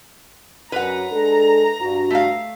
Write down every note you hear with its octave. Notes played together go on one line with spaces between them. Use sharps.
F#2 B4 F#5 A#5
G#3 D4 A4
G2 F#4
A3 F5